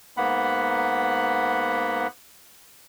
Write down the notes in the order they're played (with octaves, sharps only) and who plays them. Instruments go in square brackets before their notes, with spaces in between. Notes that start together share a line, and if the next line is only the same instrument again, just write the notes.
[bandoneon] G#2 A#3 B3 F#5 B5